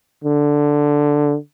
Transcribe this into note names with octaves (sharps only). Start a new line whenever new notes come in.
D3